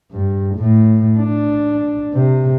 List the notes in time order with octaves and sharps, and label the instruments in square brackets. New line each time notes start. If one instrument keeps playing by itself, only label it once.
[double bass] G2
A2
D4
C3